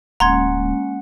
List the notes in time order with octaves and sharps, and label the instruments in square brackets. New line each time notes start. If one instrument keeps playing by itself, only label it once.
[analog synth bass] D1 [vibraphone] G#3 A#3 C#4 [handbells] F#5 [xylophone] A#5 C6 G#6